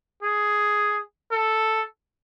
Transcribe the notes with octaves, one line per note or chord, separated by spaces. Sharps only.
G#4
A4